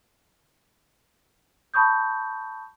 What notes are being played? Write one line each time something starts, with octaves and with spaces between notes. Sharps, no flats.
A5 B5 C#6 D#6 G6